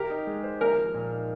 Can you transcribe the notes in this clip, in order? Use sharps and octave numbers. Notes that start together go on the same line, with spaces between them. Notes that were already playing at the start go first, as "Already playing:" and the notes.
Already playing: G4 A#4
D#4
G#3
C5
A#3 A#4
F3
A#2
D#4